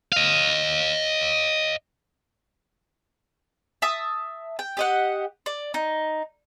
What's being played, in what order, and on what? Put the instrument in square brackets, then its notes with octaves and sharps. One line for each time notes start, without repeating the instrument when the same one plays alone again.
[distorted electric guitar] D#5 F5
[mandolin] E5 A5 D#6
G5
G4 D#5 F#5
D5
D#4